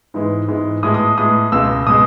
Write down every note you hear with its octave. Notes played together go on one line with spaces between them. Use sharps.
G#2 E3 G#3 B3
G#2 E3 G#3 B3
A2 G#3 B3 D#6
D#6
A2 G#3 B3 D#6
C#2 B2 G#3 E6
B2 G#3 D#6